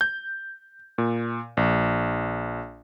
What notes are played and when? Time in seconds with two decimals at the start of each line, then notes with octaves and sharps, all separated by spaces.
0.01 G6
0.98 A#2
1.57 A#1